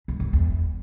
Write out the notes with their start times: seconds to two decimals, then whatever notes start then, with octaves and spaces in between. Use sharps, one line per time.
0.08 G2
0.20 F#2
0.33 E2